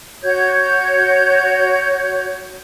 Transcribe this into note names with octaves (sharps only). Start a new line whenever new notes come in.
F#4 C#5 G6 G#6